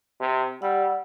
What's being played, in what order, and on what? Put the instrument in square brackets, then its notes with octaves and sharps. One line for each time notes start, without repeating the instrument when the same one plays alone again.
[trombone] C3
[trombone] G3 [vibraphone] F#5 E6